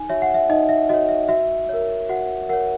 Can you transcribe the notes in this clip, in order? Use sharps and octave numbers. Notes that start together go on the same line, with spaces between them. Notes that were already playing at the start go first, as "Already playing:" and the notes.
Already playing: D#4 G#5
F#4 C#5 E5
F#5
E5
D#4 D#5
E5
F#4 C#5 D#5
E5
F#4 E5
A#4 C#5
F#4 F#5
A#4 C#5 F#5